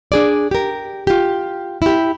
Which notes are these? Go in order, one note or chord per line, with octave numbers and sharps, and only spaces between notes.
D4 G#4 D5
G4 A#4
F4 G4
E4 G4